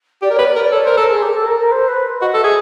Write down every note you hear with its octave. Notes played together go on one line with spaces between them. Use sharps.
G4 D5
A#4
B4 C#5
D5
A#4
D5
A4 C#5
A#4 C5
A4 A#4
G#4
G4
A4
A#4
A#4
C5
B4
F#4 D#5
A4 E5
G#4